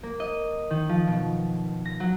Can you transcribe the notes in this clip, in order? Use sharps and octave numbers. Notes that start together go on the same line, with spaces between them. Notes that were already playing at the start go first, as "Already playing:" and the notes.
A#3
D#5
D#3
F3
B2
A#6
F#3